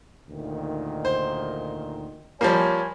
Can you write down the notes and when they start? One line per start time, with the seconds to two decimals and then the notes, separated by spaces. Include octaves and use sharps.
0.29 D2 A#2 D#3
1.05 C5
2.41 F3 G3 A#3 C#5 G#5